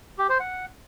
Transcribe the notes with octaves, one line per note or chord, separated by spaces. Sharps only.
G4
C5
F#5